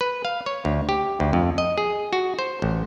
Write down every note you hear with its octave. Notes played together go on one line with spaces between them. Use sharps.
B4
F5
C#5
D2
G4
D2
F2
D#5
G#4
F#4
C5
A1